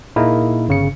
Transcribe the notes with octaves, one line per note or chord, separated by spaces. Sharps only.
A#2 A#3 D#4 E4 G#4 A#4
G1 C#3 C#7